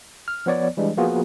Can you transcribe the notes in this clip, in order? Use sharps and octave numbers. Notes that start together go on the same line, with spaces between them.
F6
F3 B3 C#5 D5
E3 G3 G#3 D4
F3 A#3 B3 F4 F#4 G#4